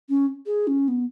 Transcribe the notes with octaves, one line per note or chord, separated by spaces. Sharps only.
C#4
G#4
C#4
B3